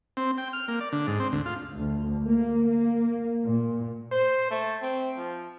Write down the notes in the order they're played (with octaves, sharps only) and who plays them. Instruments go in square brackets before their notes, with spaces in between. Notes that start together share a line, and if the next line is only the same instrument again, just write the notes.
[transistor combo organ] C4
G5
F6
A#3
D5
D3
G#2
C4
D2
F4
[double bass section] D2
A#3
A#3
A#2
[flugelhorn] C5
A3
C4
F3